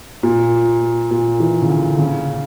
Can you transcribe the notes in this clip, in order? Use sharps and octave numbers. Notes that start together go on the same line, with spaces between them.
A#2
A#2
E3
C#3
D3
C#3